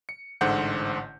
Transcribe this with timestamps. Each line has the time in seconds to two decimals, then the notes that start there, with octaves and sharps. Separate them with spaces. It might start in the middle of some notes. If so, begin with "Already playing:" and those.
0.09 C#7
0.41 A1 G#2 D3 C5 F#5 G6